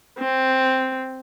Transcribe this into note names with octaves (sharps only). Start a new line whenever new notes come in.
C4